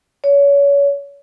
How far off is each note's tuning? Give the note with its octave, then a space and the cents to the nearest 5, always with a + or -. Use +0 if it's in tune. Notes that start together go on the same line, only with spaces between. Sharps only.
C#5 +30